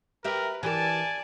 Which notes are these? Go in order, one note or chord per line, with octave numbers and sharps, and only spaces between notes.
G4 A#4 B4 E5
E3 G4 A#4 D5 G#5 A5